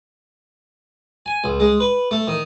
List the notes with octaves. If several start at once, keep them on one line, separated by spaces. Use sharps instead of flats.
G#5
C#2
G#3
B4
A3
D#3